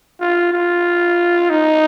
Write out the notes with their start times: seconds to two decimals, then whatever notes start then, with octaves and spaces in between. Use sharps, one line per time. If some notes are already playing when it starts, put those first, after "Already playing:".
0.21 F4
0.53 F4
1.50 D#4